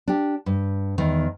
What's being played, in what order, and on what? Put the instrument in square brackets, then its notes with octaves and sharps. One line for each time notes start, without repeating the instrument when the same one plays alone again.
[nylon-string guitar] D4 G4
G2
E2 D#3